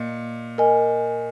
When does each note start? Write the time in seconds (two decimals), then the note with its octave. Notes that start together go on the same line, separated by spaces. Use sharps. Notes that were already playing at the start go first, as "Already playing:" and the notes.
Already playing: A#2 D#5
0.58 A#4 D#5 G#5